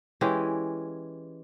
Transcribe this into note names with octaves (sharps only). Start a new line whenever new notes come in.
E3 G#3 C#4 G4